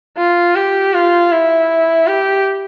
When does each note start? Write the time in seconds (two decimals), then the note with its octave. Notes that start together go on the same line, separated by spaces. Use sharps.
0.17 F4
0.55 G4
0.94 F4
1.31 E4
2.07 G4